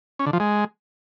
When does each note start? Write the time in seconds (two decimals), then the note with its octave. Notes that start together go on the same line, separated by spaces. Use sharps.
0.19 C#4
0.26 D3
0.33 F3
0.40 G#3